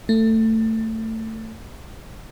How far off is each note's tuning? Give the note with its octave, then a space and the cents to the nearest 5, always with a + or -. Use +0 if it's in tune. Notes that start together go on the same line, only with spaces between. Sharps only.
A3 +20